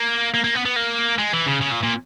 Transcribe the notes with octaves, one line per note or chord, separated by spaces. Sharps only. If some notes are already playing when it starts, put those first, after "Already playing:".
Already playing: A#3
A#3
A#3
B3
B3
A#3
G#3
E3
C#3
C#3
A#2
A#2